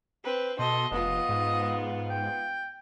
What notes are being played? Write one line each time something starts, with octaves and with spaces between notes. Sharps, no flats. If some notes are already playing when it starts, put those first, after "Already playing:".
C4 B4
B2 A4 D#5 C6
F1 B3 F4 D#5
G#2
G5